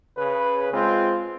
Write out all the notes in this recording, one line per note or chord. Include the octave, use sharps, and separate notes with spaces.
C#3 B4
G#3 C4 F4